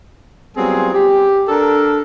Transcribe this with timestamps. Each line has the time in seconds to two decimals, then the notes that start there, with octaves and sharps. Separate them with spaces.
0.57 F#3 G3 B3 C4 F4 G#4
0.94 G4
1.49 D4 A4 A#4